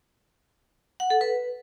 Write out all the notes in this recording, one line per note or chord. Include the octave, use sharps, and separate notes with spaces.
F#5
A4
B4